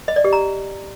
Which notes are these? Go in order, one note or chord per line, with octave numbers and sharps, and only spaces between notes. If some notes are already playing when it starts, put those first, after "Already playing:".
D#5
D5
G4
A#5